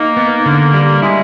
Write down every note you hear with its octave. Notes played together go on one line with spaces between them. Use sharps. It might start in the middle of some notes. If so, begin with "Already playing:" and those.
Already playing: A#3 D#4
B3
D3
G3
G#3 E4